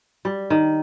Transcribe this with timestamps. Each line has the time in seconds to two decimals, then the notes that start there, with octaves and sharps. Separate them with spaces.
0.25 G3
0.50 D#3